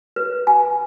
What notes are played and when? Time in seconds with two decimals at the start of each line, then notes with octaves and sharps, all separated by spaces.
0.16 B4
0.47 G#5